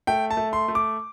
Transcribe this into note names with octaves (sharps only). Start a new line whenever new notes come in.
A3 G5
A5
A3
C6
A3
D6